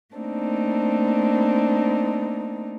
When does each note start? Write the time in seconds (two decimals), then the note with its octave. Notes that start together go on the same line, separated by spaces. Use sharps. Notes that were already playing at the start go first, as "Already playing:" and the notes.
0.15 A3 A#3 C4 D4 D#4